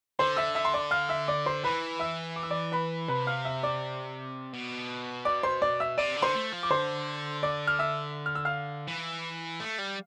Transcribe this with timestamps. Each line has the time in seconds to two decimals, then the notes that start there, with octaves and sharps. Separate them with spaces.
0.19 D3 C5 C6
0.37 E5 E6
0.55 E5 E6
0.65 C6
0.74 D5 D6
0.91 F5 F6
1.09 E5 E6
1.28 D5 D6
1.46 C5 C6
1.64 E3 B4 B5
1.99 E5 E6
2.36 D6
2.43 E6
2.51 D5 D6
2.72 B4 B5
3.08 C3 B4 B5
3.27 F5 F6
3.45 E5 E6
3.63 D5 D6
4.53 B2
5.25 D5 D6
5.43 C5 C6
5.62 D5 D6
5.80 E5 E6
5.98 C3 D5 D6
6.17 D3
6.22 C5 C6
6.35 A3
6.53 F3
6.63 D6
6.70 D3 C5 C6
7.43 D5 D6
7.67 F6
7.79 E5 E6
8.26 F6
8.35 E6
8.45 F5 F6
8.88 E3
9.60 A3
9.79 G3